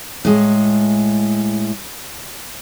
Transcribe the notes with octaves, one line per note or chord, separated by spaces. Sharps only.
A2 G#3